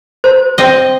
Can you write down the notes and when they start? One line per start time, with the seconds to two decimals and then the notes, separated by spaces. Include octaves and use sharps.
0.24 C5
0.58 C4 D#5